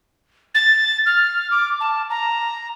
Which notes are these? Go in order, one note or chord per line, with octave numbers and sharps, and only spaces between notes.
A6
F6
D6
A5
A#5